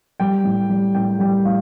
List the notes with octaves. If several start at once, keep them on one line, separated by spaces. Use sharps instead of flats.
G3 G5
A2
G3
A2 G5
G3 G5
A2 F5